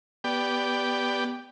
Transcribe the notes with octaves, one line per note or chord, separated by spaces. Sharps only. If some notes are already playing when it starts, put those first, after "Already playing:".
B3 G4 D5 G5